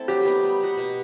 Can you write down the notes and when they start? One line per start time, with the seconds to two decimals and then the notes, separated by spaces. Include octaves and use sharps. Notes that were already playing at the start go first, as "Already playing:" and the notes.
Already playing: A3 C4 E4 A4
0.08 F#3 G4
0.25 B3 D#4
0.43 G3
0.60 B3 F#4
0.78 B2